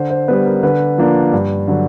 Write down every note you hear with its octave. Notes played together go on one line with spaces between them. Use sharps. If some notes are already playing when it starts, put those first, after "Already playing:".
Already playing: D3 C5
C5
G3 B3 B4
A#4
D3 B4
F3 A#3 D4
G2
D3 F#3